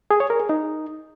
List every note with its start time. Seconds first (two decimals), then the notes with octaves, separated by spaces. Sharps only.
0.11 G#4
0.20 C#5
0.30 A#4
0.40 G#4
0.49 D#4